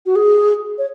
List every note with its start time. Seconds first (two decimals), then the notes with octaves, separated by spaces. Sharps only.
0.06 F#4
0.16 G#4
0.78 C#5